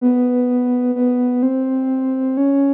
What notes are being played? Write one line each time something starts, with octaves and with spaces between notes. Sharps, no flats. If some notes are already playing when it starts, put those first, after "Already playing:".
B3
B3
C4
C#4